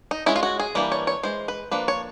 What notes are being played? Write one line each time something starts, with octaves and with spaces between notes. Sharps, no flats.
D#4
G#3 C#4 E4
F4
F#4
G#4
E3 G3 A#3 D4
C#5
C#5
E3 G#3 C5
B4
F3 A#3 D4 B4
C#5